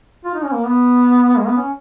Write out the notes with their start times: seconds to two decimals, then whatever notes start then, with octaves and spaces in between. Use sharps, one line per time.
0.25 F4
0.34 D#4
0.44 C#4
0.53 A#3
0.66 B3
1.37 G#3
1.47 B3
1.57 C#4